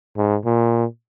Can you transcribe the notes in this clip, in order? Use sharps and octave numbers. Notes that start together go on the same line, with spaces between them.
G#2
A#2